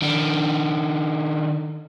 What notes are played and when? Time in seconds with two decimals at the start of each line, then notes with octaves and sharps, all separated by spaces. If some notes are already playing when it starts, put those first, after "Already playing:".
0.02 D#3 D4